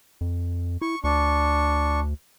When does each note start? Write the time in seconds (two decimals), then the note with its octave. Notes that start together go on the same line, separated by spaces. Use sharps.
0.21 F2
0.82 E4 C#6
1.04 D2 D4 C#6